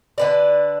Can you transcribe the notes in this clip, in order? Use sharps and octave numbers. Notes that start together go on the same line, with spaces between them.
D3 B4 D5